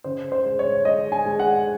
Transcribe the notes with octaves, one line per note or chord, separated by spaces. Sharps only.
C#3 C5
C5
G#3
C#5
G#3 D#5
G#5
G#3
F#5